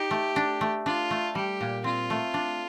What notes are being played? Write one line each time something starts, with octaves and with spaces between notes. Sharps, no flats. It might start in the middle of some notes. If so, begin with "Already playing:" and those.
Already playing: D#4 G4
A3
D4
A3
D4 F4
A3
G3 G4
A#2
C4 F4
A3
D4